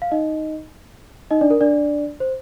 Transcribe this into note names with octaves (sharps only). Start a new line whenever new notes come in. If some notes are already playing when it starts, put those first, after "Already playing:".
F5
D#4 D#5
D#4 D#5
D4 D5
A#4
D4 D5
C5